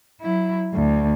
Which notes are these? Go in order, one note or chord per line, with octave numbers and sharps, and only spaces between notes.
F#3 E4
D2